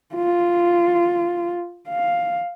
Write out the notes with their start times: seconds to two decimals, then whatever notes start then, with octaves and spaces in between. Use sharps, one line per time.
0.15 F4
1.89 F5